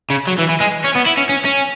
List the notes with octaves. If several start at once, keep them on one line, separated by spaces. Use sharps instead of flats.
C#3
F#3
E3
E3
G#3
C#4
B3
E4
C#4
C#4
C#4